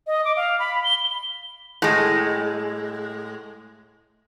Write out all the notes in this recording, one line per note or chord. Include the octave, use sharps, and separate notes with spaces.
D#5
D6
F5
B5
G7
A2 G#3